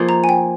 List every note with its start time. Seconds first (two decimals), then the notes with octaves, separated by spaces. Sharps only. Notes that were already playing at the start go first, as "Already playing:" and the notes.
Already playing: F3 A#3 D#4 G#4
0.09 A#5
0.24 G#5
0.29 G5